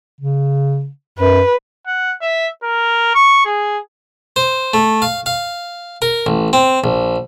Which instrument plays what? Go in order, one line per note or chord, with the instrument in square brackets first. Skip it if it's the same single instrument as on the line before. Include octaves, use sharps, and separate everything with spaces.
[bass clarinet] C#3
[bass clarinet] F#2 [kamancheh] B4
[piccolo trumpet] F#5
E5
A#4
C#6
G#4
[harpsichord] C5
A3
F5
F5
A#4
A1
C4
A#1